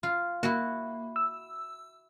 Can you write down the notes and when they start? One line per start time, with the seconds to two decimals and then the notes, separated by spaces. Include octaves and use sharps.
0.03 F4
0.43 A#3 E4 F#4
1.16 E6